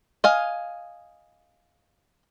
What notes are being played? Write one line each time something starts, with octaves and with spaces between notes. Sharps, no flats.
D#5 F5 G#5